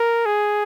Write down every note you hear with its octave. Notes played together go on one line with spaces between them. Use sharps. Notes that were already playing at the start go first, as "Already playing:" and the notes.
Already playing: A#4
G#4